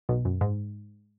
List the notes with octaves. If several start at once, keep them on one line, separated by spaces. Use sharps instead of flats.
B1 B2
F#2
G#2